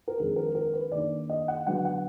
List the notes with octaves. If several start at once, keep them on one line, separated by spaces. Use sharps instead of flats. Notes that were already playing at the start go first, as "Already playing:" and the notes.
A#4
F2 D#3 G#3 D4 G#4
A#4
A#4
B4
D#3 A#3 D4 D5
D#5
F#5
D3 F#3 B3 D4 F#5
F#5